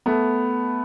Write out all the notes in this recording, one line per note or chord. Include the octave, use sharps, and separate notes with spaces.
A3 B3